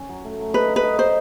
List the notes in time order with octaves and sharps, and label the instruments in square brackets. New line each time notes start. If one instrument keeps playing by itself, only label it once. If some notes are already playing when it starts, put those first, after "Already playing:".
Already playing: [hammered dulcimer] C#4
F#3
A3
F#3
[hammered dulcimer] D#4 [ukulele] B4
[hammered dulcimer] D#4
[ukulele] B4
[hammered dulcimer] D#4
[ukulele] C5